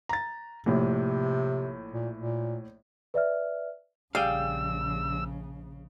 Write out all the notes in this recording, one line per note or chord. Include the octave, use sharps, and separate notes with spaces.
A#5 A6
A#1 A2 C3
A#2
A#2
B4 D5 E5 F6
A#1 C#3 G3 G#4 F5 G5 E6